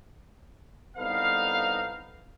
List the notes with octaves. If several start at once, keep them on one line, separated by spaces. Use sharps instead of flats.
C2 B3 D#4 A4 F5